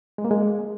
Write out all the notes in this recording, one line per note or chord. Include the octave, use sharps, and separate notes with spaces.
G#3
A#3
G#3